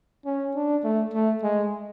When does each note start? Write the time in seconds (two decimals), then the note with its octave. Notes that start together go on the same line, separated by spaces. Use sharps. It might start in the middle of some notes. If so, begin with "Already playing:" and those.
0.26 C#4
0.56 D4
0.84 A3
1.14 A3
1.43 G#3